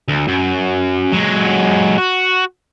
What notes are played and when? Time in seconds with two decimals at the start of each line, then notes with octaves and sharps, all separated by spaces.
0.08 D2
0.28 F#2
1.13 F#3 G#3
1.98 F#4